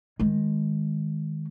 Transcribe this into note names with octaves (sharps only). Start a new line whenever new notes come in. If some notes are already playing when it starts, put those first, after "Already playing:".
D#3 G#3